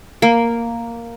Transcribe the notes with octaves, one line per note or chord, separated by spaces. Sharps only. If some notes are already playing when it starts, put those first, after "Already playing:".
A#3